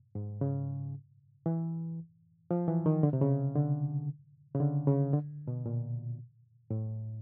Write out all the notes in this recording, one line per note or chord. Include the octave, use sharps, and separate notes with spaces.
G#2
C#3
E3
F3
E3
D#3
D3
C3
C#3
D3
C#3
D3
C#3
D3
B2
A#2
A2